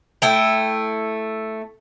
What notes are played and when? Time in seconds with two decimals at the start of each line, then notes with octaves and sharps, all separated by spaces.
0.22 A3 E4 G5